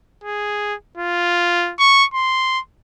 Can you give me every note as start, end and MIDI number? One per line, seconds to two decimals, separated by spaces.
0.24 0.75 68
0.97 1.73 65
1.79 2.04 85
2.14 2.59 84